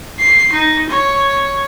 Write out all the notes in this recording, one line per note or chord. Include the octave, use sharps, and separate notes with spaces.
C7
D#4
C#5